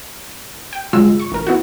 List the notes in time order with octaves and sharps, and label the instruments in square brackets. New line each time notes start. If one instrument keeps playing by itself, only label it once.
[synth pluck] G5
G1 C3 F#3 G#3 F4 E6
C#6
A1 A#4
B3 E4 F#4